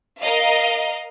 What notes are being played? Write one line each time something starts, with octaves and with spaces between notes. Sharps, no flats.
A#4 D#5 F5